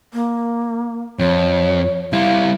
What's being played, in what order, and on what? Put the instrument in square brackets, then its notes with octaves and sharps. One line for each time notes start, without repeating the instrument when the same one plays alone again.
[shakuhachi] A#3
[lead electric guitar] F2 [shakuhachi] C#5
[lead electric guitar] G3 E4 [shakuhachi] F5